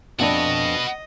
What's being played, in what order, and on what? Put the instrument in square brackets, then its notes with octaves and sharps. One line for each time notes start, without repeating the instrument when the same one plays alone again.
[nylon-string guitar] F2 D4 F#5 [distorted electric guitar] F#4 B4 [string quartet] D#5